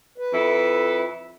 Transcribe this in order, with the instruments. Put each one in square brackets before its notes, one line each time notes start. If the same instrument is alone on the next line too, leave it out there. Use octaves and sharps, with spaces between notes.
[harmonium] B4
[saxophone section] F2 E4 A4